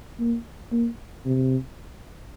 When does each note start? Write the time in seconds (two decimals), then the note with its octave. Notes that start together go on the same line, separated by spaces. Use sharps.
0.20 A#3
0.72 A#3
1.25 C3